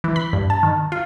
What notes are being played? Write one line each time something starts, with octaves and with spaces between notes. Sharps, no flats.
E3
B5
G2
A5
D#3
F4